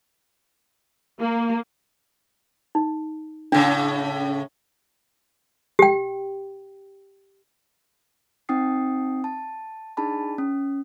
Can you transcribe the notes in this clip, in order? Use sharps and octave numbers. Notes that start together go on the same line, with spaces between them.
A#3
D#4
A2 C#3 D4
G4 G5
C4 D#4 G5 D#6 C7
A5
D4 D#4 G#4 A5 B5
C#4